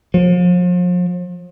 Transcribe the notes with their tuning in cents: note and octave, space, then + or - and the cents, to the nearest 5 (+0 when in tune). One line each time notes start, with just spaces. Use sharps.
F3 +40